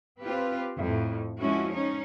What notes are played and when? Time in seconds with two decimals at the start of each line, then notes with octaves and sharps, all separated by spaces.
0.22 C4 F4 G4 B4
0.79 F2 A2
1.38 F3 G#3 C#4 E4 F#4
1.72 C#4 D#4 C#5